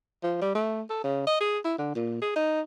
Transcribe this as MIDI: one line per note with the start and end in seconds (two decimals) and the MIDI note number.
0.24 0.40 53
0.42 0.53 55
0.55 0.82 57
0.90 1.03 69
1.04 1.25 49
1.27 1.40 75
1.41 1.59 68
1.65 1.75 64
1.79 1.91 50
1.95 2.17 46
2.22 2.32 68
2.36 2.61 63